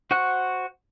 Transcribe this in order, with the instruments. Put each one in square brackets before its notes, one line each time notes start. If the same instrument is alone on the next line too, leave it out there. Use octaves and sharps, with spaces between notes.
[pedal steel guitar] F#4 C5 F#5 C#6 F#6